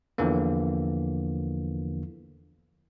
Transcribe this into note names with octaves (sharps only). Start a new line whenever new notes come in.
E2 D3 E3 F3 A#3